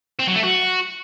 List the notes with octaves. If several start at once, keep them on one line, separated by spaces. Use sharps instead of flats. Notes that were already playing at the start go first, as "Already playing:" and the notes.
C4
F#3
A3
F#4